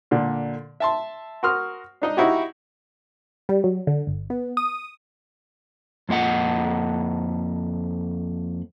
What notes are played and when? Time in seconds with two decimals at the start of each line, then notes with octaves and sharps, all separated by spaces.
0.11 A#2 D3
0.80 E5 A5 C6
1.43 F#4 A#4 C6 D#6 F6
2.02 D4 D#4 D#5
2.17 D#4 E4 F#4 G4
3.49 G3
3.64 F#3
3.87 D3
4.07 G1
4.30 B3
4.57 D#6
6.09 F2 A#3 D#5 F#5